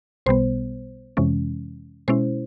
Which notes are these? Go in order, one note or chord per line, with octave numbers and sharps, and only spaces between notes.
B1 B2 G3 B3 C5
F2 C3 E3 G#3 C#4
B2 G#3 C#4 E4 C5